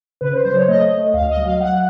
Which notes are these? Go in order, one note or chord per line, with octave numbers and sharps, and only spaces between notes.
C#3 B4
C5
F#3 C5
C#5
A3 D#5
A3
D2 F5
D#5
F#3
F5
F#3 F#5